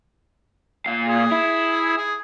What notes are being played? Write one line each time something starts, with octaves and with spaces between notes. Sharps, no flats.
A#2 F5
G#4
E4
G#4